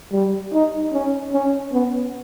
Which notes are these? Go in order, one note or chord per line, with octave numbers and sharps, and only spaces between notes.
G3
D#4
C#4
C#4
B3